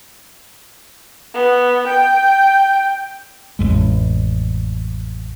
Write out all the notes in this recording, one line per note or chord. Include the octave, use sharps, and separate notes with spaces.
B3
G5
A1 F2 G#3